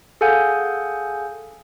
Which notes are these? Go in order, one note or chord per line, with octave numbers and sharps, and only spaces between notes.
G#4 A4 F5 F#5 G#5 G6